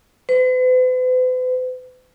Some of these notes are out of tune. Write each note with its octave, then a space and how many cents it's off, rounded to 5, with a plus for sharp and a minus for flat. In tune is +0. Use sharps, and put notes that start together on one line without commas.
B4 +45